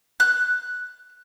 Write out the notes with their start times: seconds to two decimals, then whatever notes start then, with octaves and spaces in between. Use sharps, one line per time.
0.20 F#6